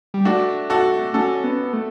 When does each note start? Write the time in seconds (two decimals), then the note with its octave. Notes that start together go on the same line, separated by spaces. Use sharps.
0.14 G3
0.25 A3 D4 F#4
0.70 F#4 A4
1.14 C#4 F#4 A4
1.44 B3
1.73 A3